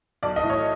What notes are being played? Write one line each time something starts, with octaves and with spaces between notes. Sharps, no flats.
B1 D5
D#5
A2 E3
C#5